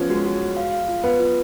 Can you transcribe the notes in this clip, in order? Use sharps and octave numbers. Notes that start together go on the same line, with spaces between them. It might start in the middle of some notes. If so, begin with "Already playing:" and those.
Already playing: F3 B3 C#4
G#3 F#4
F#4
F#4
F5
F5
F4
B3 B4
F4